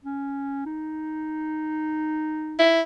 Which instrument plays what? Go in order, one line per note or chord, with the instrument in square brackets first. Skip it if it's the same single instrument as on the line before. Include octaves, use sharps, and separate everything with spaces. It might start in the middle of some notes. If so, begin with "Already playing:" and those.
[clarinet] C#4
D#4
[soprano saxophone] E4